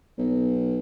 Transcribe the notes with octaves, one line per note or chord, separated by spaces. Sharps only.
B1